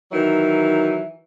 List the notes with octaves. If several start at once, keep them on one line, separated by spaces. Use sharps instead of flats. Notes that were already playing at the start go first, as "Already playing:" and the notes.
D#3 E3 F#3